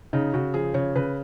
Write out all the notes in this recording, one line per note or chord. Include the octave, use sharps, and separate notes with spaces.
C#3 D#4
C#3 F#4
F3 G#4
C#3 C#5
C#3 B4